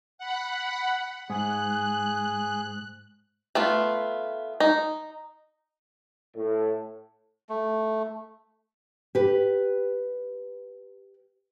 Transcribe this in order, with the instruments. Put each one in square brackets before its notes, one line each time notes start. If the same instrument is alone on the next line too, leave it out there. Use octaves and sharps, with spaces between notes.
[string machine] F#5 B5
[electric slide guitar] G#2 [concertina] G#4 [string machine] F#6
[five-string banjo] A3 B3 F4
D#4
[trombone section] A2
[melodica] A3
[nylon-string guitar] G4 B4